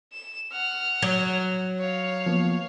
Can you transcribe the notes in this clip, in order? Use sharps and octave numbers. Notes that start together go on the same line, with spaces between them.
E7
F#5 F6
F#3
C#5 F5
F3 A#3 B3